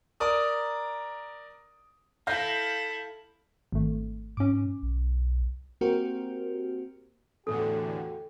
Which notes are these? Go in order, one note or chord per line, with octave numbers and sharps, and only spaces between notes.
A#4 D5 A#5 D#6
E4 A4 F5 G6 A#6
G#1 A3
G#2 C#4 D6
B1
A#3 C4 F#4 G4 A#4 C5
E2 A2 D3 F#4 G4 A4 G#5